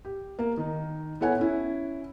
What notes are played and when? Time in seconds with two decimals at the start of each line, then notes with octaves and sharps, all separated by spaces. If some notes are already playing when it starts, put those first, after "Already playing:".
0.05 G4
0.39 A#3
0.57 D#3 D#4
1.20 B3 E4 A4 C#5 F#5 G#5
1.38 C#4 E4